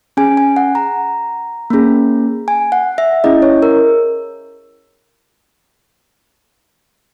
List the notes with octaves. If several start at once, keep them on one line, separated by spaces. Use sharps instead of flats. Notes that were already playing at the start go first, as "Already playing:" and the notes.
C#4 G#4 G#5
G#5
F#5
A#5
A#3 C#4 G#4
G#5
F#5
E5
C#4 E4 G#4 D#5
C#5
A#4